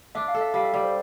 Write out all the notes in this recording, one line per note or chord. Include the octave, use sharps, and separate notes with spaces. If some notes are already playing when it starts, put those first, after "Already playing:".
D4 E5
F5
A4
E5
G3 F5
E5
G3 D5
C5